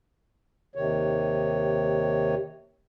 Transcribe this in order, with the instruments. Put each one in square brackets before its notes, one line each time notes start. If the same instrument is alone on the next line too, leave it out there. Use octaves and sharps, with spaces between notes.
[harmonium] D#2 C3 D#3 C#5